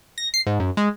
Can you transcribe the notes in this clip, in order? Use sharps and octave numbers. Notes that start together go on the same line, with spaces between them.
A#6
C7
G#2
F#2
G#3